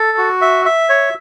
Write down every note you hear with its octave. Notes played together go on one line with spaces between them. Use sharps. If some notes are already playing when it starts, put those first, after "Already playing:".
Already playing: A4
F#4
E5
E5
C#5